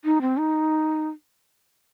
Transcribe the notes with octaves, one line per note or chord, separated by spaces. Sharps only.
D#4
C4
D#4